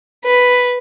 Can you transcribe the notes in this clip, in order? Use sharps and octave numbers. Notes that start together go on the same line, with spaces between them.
B4